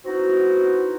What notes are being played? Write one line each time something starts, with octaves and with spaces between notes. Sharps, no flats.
B3 C4 D#4 E4 F#4